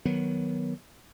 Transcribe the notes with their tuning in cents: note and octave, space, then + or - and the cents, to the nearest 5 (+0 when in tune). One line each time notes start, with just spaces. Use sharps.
D#3 +0 F#3 +0 B3 -15